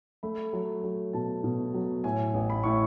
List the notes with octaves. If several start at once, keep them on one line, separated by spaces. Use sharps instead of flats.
A3 B5
F#3
F#3
B2 A5
B2
F#3
A2 G#5
A1
B5
A2 C#6